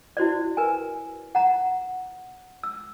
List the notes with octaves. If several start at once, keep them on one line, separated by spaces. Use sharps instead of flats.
E4 F#4 C5 D5
A#4 B4 G#5
F#5 A#5
E6